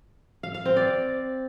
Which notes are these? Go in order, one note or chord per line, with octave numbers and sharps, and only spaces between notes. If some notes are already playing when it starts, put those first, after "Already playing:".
F5
F5
C4
D5